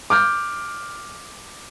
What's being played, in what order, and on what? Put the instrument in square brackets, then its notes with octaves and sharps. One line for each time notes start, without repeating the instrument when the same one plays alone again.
[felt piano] D6 F6 G6